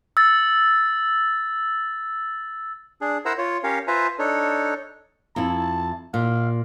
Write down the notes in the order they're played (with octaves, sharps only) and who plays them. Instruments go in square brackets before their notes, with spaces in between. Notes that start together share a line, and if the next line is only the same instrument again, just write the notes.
[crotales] E6 A6
[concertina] D4 G#4
E4 A#4 C5 F#5 A#5 E6
F4 C#5
C#4 G4 A#4 C#5 F5
F4 B4 C5 E5 G#5 A#5
D4 D#4 A4 C#5
[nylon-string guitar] F2 E4 [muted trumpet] A5
[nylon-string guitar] A#2 [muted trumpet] F5